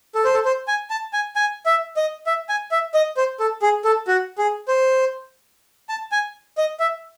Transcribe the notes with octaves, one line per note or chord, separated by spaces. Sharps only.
A4
C5
A4
C5
G#5
A5
G#5
G#5
E5
D#5
E5
G#5
E5
D#5
C5
A4
G#4
A4
F#4
G#4
C5
A5
G#5
D#5
E5